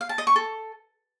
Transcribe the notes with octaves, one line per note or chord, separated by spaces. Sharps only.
F5
A5
D#5
C#6
A4